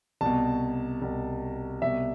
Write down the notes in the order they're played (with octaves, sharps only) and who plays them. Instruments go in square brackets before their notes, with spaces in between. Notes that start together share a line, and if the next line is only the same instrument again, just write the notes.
[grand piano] C2 B2 A5
C2 B2
C2 B2 E5